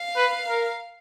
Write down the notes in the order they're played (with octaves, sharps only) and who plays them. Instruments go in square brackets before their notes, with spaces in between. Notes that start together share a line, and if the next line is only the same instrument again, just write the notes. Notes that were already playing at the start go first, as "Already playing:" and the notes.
Already playing: [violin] F5
[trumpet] B4
A#4